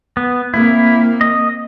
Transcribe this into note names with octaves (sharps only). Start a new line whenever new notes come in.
B3
A#3 C4 E4
D#5